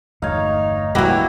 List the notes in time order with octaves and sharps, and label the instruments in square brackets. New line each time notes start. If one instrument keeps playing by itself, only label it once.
[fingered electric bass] G1 E2 A3 [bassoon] D#4 [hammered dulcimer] C#5 F5
[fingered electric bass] G1 G2 [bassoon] E2 [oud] F#3 A#3 [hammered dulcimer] E4 F#4 G4